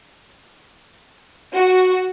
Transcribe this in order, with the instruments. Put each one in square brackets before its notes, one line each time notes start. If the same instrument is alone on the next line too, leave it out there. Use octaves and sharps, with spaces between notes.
[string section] F#4